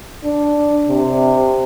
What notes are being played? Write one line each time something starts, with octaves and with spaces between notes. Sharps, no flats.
D4
C3